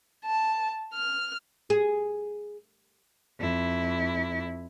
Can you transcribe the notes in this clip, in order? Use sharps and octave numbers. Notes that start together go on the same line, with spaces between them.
A5
F6
G#4
F2 E4